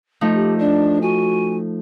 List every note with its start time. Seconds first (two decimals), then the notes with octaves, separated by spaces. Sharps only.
0.21 F3 A3 D#4
0.35 G4
0.59 D4 D5
1.01 F#4 G#5